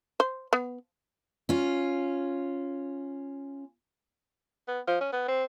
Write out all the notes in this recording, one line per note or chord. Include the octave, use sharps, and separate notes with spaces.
C5
B3
C#4 F4
B3
F3
C#4
B3
C4